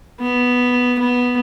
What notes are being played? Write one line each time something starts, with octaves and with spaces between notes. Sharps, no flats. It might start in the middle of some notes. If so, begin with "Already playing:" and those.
B3
B3